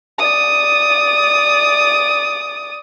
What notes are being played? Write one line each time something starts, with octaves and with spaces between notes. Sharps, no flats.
D5 D#6